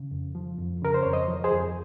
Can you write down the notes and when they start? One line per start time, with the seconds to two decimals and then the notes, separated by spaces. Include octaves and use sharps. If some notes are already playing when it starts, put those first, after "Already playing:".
Already playing: C#3
0.11 F2
0.35 F3
0.58 F2
0.82 C#3 A#4
0.94 C5
1.03 F2 C#5
1.13 C5 D#5
1.28 F3
1.44 G#4 C5
1.52 F2